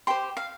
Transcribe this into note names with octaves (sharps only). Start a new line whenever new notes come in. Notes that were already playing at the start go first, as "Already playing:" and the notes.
G4 C5 C6
F5